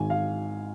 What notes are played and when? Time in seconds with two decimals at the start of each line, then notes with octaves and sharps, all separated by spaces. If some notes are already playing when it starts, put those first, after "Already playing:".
Already playing: G#1 G#2 D#3 G#5
0.10 F5